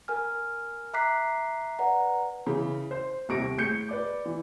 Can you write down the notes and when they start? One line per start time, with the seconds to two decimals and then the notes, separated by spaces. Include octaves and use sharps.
0.08 A#4 G#5 F6
0.94 E5 A#5 D6 F#6 B6 C7
1.79 B4 D5 F#5 A#5
2.47 C#3 E3
2.91 C5
3.29 D#1 C2 C3 C#6 A#6 D7
3.58 A2 G#4 G6 C#7
3.89 B4 D5 D6
4.26 E3